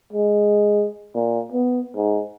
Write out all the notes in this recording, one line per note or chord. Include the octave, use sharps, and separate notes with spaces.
G#3
A#2
B3
G#2